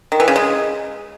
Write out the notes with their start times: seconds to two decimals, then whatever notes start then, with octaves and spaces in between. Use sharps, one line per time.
0.12 D#3
0.20 E3
0.28 C#3
0.36 G#3